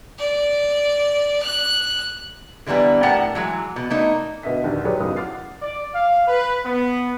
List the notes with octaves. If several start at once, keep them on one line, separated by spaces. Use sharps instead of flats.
D5
F#6
D3 E3 G3 A#3 B3
A2 G4 A#4 F#5 A5
E3 F#3 G#3
B2
A3 A#3 D#4
B2 D3 D#5 E5 B6
A#1 D#2 D3
F#3 G4 G#4 B4 C#5 D5
F#1 B1 D#6
F#5 D6 F6 A6 C7
D5
F5
B4
B3